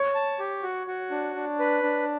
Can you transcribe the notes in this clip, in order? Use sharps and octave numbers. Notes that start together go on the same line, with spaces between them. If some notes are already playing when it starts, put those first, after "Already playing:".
Already playing: C#5
A5
G4
F#4
F#4
D4
D4
B4
D4